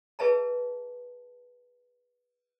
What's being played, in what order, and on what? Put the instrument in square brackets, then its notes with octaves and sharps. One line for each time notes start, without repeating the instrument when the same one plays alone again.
[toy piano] G#4 B4 E5 A5 A#5